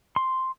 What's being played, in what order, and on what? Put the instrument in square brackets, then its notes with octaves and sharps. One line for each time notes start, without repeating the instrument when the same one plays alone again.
[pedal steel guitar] C6